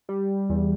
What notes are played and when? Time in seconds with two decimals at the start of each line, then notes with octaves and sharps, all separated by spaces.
0.09 G3
0.50 E2